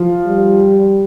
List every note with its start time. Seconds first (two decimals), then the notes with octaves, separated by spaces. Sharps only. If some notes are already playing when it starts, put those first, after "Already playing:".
Already playing: F3
0.27 G3